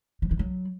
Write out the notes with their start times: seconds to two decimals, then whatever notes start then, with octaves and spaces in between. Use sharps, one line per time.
0.22 F3
0.31 E3
0.39 F#3